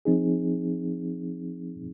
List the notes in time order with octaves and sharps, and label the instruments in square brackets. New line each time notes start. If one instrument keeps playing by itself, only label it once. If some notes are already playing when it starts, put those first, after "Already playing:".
[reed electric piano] F3 C4 D#4 G#4